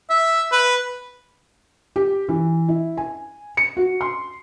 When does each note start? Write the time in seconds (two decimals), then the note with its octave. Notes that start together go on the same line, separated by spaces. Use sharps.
0.10 E5
0.52 B4
1.96 G4
2.29 E3
2.68 E4
2.97 G#5
3.57 C#7
3.77 F#4
4.01 C6